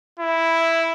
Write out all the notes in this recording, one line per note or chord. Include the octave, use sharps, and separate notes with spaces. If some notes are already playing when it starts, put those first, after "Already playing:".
E4